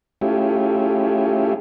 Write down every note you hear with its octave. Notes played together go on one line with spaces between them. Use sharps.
A3 C#4 E4 F4 G4 G#4